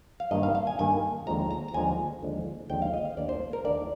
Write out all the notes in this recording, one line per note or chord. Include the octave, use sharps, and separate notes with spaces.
F5
G2 D#3 A#3 D#5
F5
F5
G#5
G2 D#3 A#3 G#5
D#2 D3 F3 G#3 A#5
A#5
A#5
D#2 D3 F3 G#3 G#5
D#2 D3 F3 G#3
D#2 D3 F3 G#3 G5
F5
D#5
F5
D#2 D#3 A#3 D4 D5
C5
A#4
D#2 D#3 A#3 D4 D5